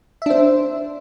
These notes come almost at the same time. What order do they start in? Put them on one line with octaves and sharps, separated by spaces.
E5 D4 C5